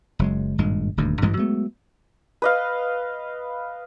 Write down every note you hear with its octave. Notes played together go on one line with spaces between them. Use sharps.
F#1 F#3 G#3
G#1 G2 A#2 G#3
D#1 D2 G2
A1 G2 E3 G#3
F#3 G#3 A3 B3
B4 D#5 F5